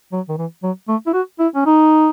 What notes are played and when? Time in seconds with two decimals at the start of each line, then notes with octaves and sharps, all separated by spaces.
0.12 F#3
0.29 D#3
0.38 E3
0.63 F#3
0.88 A3
1.07 E4
1.14 F#4
1.39 E4
1.55 C#4
1.66 D#4